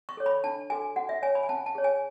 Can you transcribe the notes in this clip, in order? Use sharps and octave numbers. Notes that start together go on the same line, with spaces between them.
C#6
A4 C#5
B5
D4 A5
F#4 A4 G#5
F#4 F#5
E5
C#5 G#5
B5
G#5
C#4 A5
A5
G#4 C#5
G#5